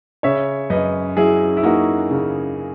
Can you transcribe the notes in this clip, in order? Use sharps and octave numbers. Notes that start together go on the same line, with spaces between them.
C#3 C#5 E5
F#2 B4 D#5
F#3 E4 G#4
E4
A#3 D#4 F#4
C#3